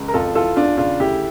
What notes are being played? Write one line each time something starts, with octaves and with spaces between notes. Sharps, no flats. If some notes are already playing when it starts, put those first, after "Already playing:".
Already playing: C#2
A#4
F2 F4 A4
E3 F4 A4
E2 D4 F4
C#3 D4 F4
D2 E4 G4